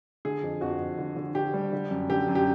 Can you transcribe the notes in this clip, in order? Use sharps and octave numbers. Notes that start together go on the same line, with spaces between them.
D3 G#4
F2
F2 F#4
F2
D3
D3
D3 G4
G3
D3
F#2
D3 G4
F#2
G4